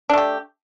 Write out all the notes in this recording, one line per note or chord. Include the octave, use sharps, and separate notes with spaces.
A3 D4 G4